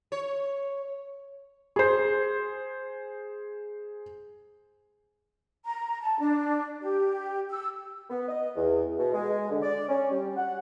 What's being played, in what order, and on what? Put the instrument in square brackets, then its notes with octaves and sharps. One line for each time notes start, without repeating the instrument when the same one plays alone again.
[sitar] C#5
[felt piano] G#4 C5
[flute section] A#5
A5
D4
G4
E6
[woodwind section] B3
D#5
E2
B2
G#3
D3
D5
C#4
G3
F#5